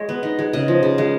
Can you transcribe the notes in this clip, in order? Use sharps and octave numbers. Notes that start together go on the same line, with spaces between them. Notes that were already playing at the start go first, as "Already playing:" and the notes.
Already playing: G#3 C#5 D#5
B3
D#4
G#3
C#3 D#5
F3
C#3
G#3